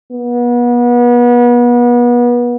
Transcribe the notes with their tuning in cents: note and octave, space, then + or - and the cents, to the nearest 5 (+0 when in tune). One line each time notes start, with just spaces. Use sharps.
B3 -35